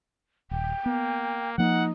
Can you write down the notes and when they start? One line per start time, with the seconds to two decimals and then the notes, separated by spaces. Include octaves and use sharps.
0.51 D#1 G5
0.86 A#3 B3
1.58 F3 A#3 D#4 F#5